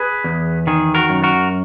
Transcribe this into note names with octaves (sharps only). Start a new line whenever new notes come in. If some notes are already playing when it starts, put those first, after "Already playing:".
Already playing: G#4 B4
E2
D#3 G#4
F#4 A#4
F#2
F#4 A#4